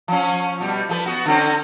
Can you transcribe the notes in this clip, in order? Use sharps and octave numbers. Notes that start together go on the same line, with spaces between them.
F3 C#4
B2 G3
F3 G#4 B4
B3 F#4
D3 C4 C#4